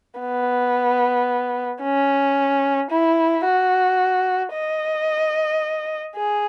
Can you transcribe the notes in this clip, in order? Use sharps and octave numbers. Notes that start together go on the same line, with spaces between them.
B3
C#4
E4
F#4
D#5
G#4